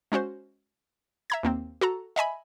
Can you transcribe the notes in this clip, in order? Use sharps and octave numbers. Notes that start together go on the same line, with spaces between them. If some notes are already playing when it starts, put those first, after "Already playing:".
G#3 C#4 F#4 C5
E5 A#5 G#6
D#2 A#3 C4
F#4 A4 A#5
D#5 E5 G#5 B5